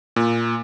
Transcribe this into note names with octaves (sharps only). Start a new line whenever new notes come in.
A#2